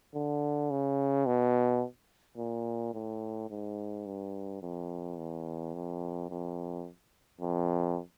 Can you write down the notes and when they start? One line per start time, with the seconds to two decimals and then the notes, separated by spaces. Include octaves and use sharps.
0.15 D3
0.71 C#3
1.26 B2
2.37 A#2
2.94 A2
3.50 G#2
4.06 G2
4.62 F2
5.17 E2
5.74 F2
6.29 F2
7.41 F2